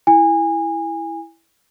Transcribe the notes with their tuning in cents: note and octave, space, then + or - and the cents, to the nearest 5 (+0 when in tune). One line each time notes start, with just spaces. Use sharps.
E4 +0 G#5 -25